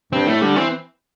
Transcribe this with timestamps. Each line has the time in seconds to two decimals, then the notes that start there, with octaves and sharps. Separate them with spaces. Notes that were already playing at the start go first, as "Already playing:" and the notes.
0.13 G2 C4
0.27 A2 A3
0.42 D3 G3
0.56 E3 C4